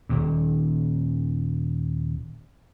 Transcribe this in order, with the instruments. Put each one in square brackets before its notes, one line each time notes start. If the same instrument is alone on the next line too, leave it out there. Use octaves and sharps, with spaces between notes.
[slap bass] D#1 D#2 A#2